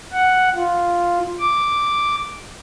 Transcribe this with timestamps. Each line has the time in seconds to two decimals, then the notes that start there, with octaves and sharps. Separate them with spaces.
0.13 F#5
0.55 F4
1.39 D6